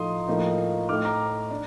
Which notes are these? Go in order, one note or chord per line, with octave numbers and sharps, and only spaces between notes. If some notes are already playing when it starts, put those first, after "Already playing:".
Already playing: A2 F3 A3 D#4 C6 D#6
A2 F3 A#3 D#4
A2 A3 D#4 D6 F6
A#5 D6
D4